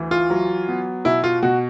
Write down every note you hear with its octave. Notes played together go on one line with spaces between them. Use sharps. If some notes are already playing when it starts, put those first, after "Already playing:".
Already playing: D2 E3
F4
F#3
B3
B2 E4
F4
B2 F#4